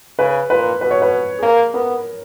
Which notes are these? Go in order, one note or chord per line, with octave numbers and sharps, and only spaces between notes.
C#3 B4
A#2 B4
B2 B4
C#5
B4
G#4
A#3 A#4
B3 A#4